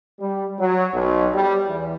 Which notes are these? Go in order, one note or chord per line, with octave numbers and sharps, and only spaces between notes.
G3
F#3
B1
G3
E2